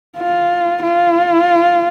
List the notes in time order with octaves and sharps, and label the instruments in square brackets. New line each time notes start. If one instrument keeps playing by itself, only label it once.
[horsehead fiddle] F4
F4